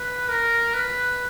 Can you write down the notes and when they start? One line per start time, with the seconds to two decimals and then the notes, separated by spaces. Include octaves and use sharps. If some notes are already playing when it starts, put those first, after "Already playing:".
Already playing: B4
0.29 A#4
0.74 B4